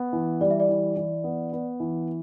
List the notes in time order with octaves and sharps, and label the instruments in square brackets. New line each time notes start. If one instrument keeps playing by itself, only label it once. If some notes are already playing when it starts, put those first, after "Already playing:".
Already playing: [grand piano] B3
E3
[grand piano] G3 [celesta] D5
[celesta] E5
D5
[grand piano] E3
E3
B3
B3
E3